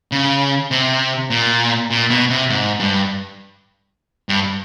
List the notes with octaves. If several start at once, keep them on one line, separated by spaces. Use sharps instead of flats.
C#3
C3
A#2
A#2
B2
C3
G#2
G2
G2